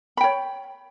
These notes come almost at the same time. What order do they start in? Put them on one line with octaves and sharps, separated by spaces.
B5 G5 C#5